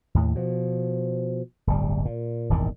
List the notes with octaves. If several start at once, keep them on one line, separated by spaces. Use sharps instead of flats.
D#2 A2
B2 F3
D1 G1 G3
A#2
D#1 G#1 E2 D#3